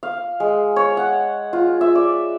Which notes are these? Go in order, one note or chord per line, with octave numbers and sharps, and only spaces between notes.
F5
G#3
C#5
F#5
F4
E5
D5